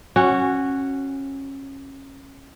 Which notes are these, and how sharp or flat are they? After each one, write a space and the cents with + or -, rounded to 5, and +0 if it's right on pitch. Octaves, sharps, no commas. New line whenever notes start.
C#4 -20 F#4 +0